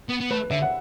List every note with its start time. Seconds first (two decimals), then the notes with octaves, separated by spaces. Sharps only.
0.09 B3
0.20 B3
0.30 A3 B4
0.50 D3 E5
0.62 F#5